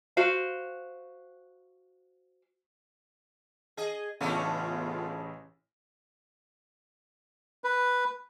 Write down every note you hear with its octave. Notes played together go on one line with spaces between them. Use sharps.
F#4 C5 F5
G#4 D#5
A1 C#3 A3 B3 C#4 D4 F4
B4